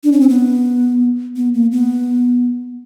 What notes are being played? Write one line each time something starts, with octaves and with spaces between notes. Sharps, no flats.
D4
C#4
C4
B3
B3
A#3
B3